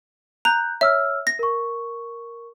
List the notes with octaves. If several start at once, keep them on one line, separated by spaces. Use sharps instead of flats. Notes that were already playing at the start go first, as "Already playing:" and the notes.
A#5 F#6 G6
C#5 E5 E6 F6
A#6
A#4 C#6